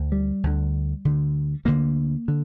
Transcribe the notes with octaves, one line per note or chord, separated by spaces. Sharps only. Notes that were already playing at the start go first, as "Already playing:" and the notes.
Already playing: D2 D3
G3
D2 D3
D2 D3
D2 D3 A#3
D3